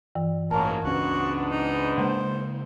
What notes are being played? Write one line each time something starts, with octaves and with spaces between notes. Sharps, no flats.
G2 E3
A1 G#2 F#3 A#3 A#4 A5
C#2 G#2 B3 C#4 D4 F#4
D#4
C#3 G#3 A#3 C5